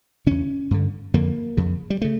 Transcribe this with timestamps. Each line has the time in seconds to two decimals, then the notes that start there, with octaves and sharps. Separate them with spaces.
0.26 E2 C#3 C#4
0.71 G2 D3
1.14 F2 D3 A#3
1.57 F2 C#3
1.90 G3
2.02 C#3 A3